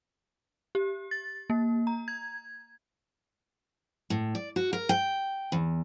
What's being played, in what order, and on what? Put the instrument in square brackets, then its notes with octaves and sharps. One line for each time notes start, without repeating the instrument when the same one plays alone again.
[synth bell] G4
A6
A#3
A#5
G#6
[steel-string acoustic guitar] A2
D5
F#4
A#4
G5
E2